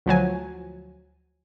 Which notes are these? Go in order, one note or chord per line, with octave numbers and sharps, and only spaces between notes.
D2 F3 F#3 G#5